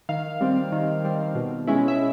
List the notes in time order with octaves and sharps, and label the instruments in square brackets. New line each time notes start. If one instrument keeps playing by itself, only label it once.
[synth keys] D#3 F5
G3 C4
D#3
G3 C4
B2
G#3 C#4 E4
E5